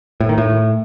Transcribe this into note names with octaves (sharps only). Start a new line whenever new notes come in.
A2
D#3
A2